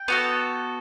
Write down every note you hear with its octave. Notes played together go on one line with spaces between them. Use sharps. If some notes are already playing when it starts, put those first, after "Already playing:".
Already playing: G5
B3 F#4 A4